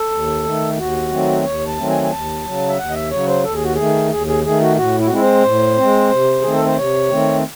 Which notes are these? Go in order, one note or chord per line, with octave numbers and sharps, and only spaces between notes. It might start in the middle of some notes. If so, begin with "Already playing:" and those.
Already playing: A4
D#2
D#3 A3
D#2 F#4
D#3 F#3 A3 C4
D#2 C#5
A5
D#3 F#3 A3 C4
G#5
G#5
D#2 A5
C#3 F#3
E5
D#2 F#5
D#5
E5
C#3 F#3 C#5
C5
D#2 A4
G#4
F#4
D#3 A3 G#4
D#2 G#4
G#4
D#3 A3 G#4
F#4
A2 F#4
E4
F#4
G#3 C4 E4
C5
A2
G#3 C4
C3
D#3 A3 C4 G#4
A4
C5
C3 C#5
D#3 A3 C4